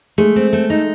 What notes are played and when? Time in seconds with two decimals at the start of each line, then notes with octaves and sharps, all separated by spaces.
0.18 G#3 A3
0.36 C4
0.53 A3
0.70 D#4